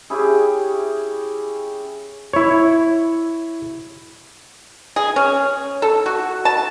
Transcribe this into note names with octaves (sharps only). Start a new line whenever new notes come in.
C#4 E4 G4 G#4
E4 C#5
G#4
C#4
A4
F#4
A5